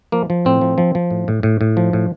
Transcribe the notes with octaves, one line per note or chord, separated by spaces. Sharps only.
F3 A#3
F3
A2 C4
F3
F3
F3
A2
A2
A2
A2
F3
A2